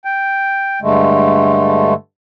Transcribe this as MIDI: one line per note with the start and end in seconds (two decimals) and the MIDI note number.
0.05 0.80 79
0.82 1.94 43
0.82 1.94 50
0.82 1.94 56
0.82 1.94 57